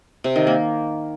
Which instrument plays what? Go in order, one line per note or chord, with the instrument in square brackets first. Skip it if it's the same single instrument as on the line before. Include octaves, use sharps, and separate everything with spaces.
[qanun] C3
D#3
A#3